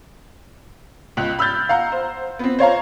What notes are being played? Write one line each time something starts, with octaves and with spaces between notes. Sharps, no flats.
C#2 F#6
B5 E6 F6 G6 A6
F5 F#5 A#5
C5
B3 C4
C5 C#5 F5 A#5